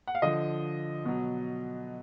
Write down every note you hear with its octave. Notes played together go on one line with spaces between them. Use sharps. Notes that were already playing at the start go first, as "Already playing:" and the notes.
F#5
F5
D3 F3 D#5
B2 F#3